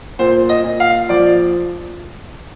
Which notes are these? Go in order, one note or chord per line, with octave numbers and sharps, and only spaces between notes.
A#2 C5
D#5
A#2
F5
F3 D5